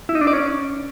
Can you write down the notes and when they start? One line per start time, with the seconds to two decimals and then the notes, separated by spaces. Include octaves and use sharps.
0.09 E4
0.15 D#4
0.21 D4
0.27 D5
0.33 C#4